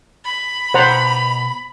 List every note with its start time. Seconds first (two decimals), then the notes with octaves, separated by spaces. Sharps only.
0.25 B5
0.74 B2 C5 F#5 A#5